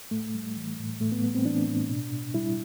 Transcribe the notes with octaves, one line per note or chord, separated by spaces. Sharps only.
A2 A3
G3
E3
A2
A2 A3
B3
G3 B3
C4
E3 D4
A2
B2
B2
G3 E4